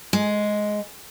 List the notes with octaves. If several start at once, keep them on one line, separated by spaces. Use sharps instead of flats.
G#3